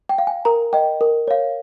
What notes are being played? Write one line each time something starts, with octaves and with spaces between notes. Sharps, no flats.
G5
F5
G#5
A#4 A#5
D#5 G5
A#4
C#5 F5